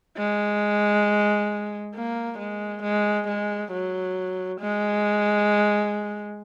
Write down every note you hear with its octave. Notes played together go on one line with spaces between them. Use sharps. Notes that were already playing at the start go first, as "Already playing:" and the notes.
G#3
A#3
G#3
G#3
G#3
F#3
G#3